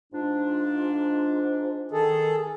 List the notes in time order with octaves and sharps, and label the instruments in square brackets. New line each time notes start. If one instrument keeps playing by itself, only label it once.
[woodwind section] G#2 D4 [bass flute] F4
[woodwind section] D#3 [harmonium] G#4 A4